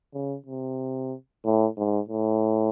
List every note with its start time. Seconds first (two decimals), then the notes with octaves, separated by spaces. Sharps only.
0.14 C#3
0.46 C3
1.44 A2
1.77 G#2
2.09 A2